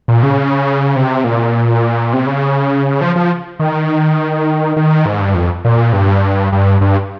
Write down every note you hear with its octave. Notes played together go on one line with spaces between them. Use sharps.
A#2
C#3
C3
A#2
C3
C#3
F3
F3
D#3
D#3
G#2
G2
F2
A#2
G2
G2
G2